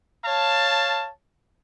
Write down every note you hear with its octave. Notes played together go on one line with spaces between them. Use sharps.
C#5 F5 A5